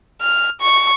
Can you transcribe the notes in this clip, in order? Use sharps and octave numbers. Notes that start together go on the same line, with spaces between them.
F6
C#6